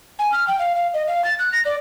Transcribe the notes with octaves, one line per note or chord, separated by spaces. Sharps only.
G#5
F6
G5
F5
F5
D#5
F5
A6
F#6
A#6
D5